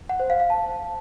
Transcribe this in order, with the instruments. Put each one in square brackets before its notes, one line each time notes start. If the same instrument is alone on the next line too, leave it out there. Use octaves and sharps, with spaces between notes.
[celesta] F#5
C5
F5
F5
A5